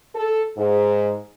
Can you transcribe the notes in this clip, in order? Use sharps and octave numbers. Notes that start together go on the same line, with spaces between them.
A4
G#2